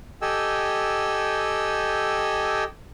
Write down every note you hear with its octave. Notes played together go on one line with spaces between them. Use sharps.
G4 A4 D#5 G5 G#5 E6